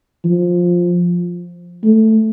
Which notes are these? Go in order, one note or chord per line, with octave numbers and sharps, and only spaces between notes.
F3
A3